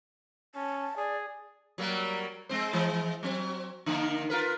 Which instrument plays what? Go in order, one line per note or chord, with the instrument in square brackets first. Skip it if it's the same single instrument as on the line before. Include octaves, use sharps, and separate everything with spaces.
[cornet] C#4 [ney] A5
[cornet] G#4 [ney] D5
[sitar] F#3 G3 A#3
G#3 C4 C5
E3 G#3
F#3 C4
D3 D#3 A#3
F4 A#4 B4